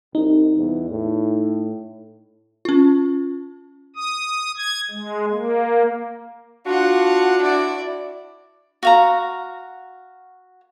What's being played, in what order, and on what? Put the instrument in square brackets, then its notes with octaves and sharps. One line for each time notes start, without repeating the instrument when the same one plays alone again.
[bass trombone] C2 [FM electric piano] D#4
[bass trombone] E2
A2
[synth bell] C#4 F4
[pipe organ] D#6
G#6
G#3
A#3
[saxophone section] D4 F#4 [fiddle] F4 F#5
[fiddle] E4 D5
[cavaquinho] F#4 F5 A#5